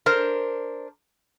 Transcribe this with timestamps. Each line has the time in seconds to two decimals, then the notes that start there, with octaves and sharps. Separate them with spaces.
0.06 D4 A#4 C5